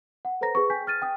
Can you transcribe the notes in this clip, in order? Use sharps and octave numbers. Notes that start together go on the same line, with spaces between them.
F#5
A4 B4 C5 A#5 A#6
G#4 B4 C#6
G5 G#5 G6 B6
F6 A6 D#7
G5 D#6